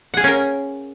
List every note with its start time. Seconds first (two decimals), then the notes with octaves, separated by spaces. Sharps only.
0.14 F#5
0.17 G#4
0.21 F5
0.24 C#4
0.27 A#4